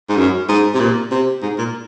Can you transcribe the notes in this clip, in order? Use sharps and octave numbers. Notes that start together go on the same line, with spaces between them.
G#2
F#2
G#2
C3
A#2
C3
G#2
A#2